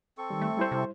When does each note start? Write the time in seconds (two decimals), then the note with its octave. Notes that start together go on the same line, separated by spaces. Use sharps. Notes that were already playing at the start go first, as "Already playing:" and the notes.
0.18 C4 A4 C#6
0.30 D#3 G3
0.41 A3
0.57 G3 E4 C5
0.72 C3